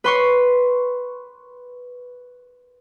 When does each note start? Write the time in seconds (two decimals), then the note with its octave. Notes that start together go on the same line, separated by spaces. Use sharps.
0.04 B4 C6 C#6